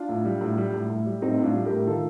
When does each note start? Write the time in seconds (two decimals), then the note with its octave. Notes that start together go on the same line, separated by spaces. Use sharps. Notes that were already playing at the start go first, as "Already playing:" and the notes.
Already playing: D4 F4
0.09 A2
0.25 G3
0.41 A2
0.57 G3
0.74 A2
0.90 A2
1.06 G3
1.22 A2 C4 D#4
1.38 A2
1.44 D4 F4
1.55 G3
1.65 G4 A#4
1.71 A2
1.87 D#3 F4 A4